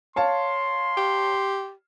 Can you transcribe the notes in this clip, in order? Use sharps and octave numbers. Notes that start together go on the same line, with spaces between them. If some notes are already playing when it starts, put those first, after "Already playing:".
C#5 F5 A5 C6
G4